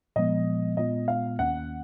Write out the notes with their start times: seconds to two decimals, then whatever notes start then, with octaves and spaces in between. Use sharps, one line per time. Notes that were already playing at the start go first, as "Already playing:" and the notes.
0.16 A#2 F3 G#3 B3 D#5
0.77 A#2 G#3 B3 F4 D#5
1.08 F5
1.39 D#2 D#3 A#3 C#4 F#5